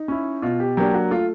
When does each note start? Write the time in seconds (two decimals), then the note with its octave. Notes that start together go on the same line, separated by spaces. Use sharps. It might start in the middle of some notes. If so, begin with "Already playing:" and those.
Already playing: D#4
0.08 C#4 E4
0.42 B2 F4
0.60 G4
0.77 F#3 A#3 D4 G4
0.94 F#4
1.11 A3 F4